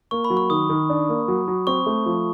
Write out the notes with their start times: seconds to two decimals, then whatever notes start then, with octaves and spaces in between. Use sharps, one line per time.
0.11 A#3 C#6
0.24 B5
0.30 F#3
0.37 C#6
0.50 D#3 D#6
0.70 D#3
0.89 D4
1.09 A#3
1.28 F#3
1.48 F#3
1.67 C4 C#6
1.86 A3
2.06 F3